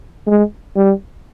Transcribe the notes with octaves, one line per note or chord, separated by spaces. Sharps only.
G#3
G3